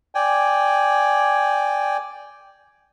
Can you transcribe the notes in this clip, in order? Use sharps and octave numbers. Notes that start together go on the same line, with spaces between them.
D5 G5 G#5